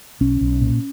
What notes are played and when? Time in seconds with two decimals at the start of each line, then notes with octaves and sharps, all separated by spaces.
0.21 B1 C#4
0.41 B1
0.61 A#2